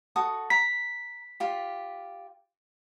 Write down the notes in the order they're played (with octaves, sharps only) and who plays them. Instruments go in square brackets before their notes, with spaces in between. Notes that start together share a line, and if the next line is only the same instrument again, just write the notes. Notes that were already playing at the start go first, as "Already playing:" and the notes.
[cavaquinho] F#4 A4 D#6
[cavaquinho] A#5 [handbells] B6
[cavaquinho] F4 G4